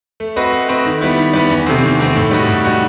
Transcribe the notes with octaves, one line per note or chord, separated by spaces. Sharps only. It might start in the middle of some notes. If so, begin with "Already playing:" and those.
A3
C4 F#4 B4 D#5
A3
C4 F#4 B4 D#5
D#3
G3 B3 E4
D#3
G3 B3 E4
E2
C3 D#3 A3 C4
E2
C3 D#3 A3 C4
A2
G3 D#4 F#4
A2
G3 D#4 F#4